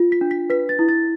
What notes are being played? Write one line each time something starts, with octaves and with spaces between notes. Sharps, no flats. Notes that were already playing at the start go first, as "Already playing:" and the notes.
Already playing: F4
B6
D4
B6
B4 B6
A6
E4
A6